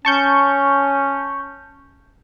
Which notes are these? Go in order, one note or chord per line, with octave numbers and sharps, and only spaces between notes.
C#4 A5 C#6 G6